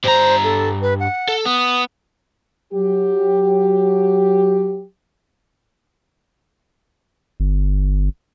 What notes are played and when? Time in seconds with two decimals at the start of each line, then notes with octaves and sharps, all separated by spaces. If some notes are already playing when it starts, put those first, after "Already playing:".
0.04 G2 C5 A#5
0.44 A4
0.82 B4
1.00 F#5
1.29 A4
1.45 B3 D#6
2.73 F#3 G4
7.40 G1